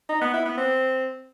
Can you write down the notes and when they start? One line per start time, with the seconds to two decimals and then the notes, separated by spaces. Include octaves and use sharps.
0.09 D#4
0.21 B3
0.33 E4
0.45 B3
0.57 C4